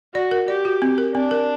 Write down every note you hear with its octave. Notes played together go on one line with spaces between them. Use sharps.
F#4 D5
A#4
G4 D5
F#4
C4
A#4
C4 D4
A#4